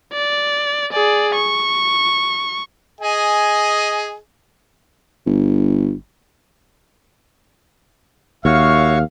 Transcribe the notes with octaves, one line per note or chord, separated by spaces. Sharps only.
D5
G#4 D5
C#6
G#4 D#5 G#5
G1
D#2 F#4 C#5 E5 F5 C#6